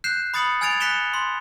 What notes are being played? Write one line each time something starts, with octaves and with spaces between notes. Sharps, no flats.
F#6 G6 C7 E7
B5 D#6 A6 C#7 F#7
G#5 F6 G#6 A6 D7 F7
F#6 B6 C#7 E7 G7
C6